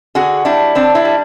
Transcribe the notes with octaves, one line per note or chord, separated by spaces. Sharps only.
D3 F#4 G#4
G3 D4 E4
D3 C4 D4
D4 E4
G3